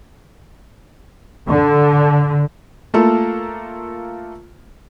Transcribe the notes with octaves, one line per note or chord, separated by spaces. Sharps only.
D3
A3 A#3 F4 A4